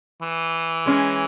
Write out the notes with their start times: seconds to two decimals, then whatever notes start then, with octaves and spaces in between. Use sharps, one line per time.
0.22 E3
0.86 G#3 C#4 G#4